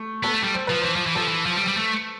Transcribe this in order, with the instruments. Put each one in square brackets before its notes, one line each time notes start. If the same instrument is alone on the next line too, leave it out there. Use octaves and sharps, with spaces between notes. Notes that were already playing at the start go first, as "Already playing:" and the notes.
Already playing: [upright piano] A3
[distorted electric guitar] B3 [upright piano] A4
[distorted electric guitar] A3
G3
[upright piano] C5
[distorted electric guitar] F3 [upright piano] B4
[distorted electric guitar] E3 [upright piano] C5
[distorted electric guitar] F3
E3
[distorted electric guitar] F3 [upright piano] A4
[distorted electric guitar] E3
F3
G3
G3
A3